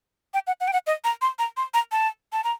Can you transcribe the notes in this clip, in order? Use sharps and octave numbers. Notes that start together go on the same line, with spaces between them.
G5
F#5
F#5
G5
F#5
D#5
A#5
C6
A#5
C6
A#5
A5
A5
A#5